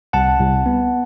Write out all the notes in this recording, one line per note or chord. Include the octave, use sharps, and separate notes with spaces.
C2 F#5 A5
C2
B3